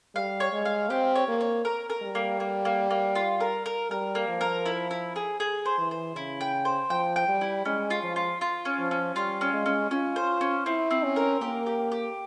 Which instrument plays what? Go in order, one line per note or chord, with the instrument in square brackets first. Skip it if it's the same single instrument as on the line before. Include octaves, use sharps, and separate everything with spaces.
[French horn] G3 [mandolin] F5
[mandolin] C#5
[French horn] G#3
[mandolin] F5
[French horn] C4 [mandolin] G4
[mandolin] C#5
[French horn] A#3
[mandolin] C#5
A#4
A#4
[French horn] G3
[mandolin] A#3
A#3
A#3
A#3
F4
A#4
A#4
[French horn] G3 [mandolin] A#4
[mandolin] A#3
[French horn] F3
[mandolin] A#4
E4
E4
G#4
G#4
C5
[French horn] E3
[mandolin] C5
[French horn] C#3 [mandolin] E4
[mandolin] G5
C5
[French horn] F3 [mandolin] G5
[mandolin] G5
[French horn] G3
[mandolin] E4
[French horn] G#3 [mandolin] C#4
[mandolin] F4
[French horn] F3
[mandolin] F4
F4
C#4
[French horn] F3
[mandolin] C#4
[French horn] G3 [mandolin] F4
[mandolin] C#4
[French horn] G#3
[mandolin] C#4
[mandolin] C#4 [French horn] F4
[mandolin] C5
C#4
[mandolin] C4 [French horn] E4
[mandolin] C4
[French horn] C#4
[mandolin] A#4
[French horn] A#3 [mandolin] G4
[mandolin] G4
G4